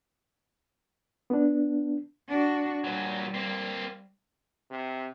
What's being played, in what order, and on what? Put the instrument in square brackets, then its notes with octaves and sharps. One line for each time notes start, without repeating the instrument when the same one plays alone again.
[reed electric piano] B3 D4
[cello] D4 F#4
[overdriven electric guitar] A#2 F#3 [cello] G3
[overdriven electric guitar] A#3 C4
[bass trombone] C3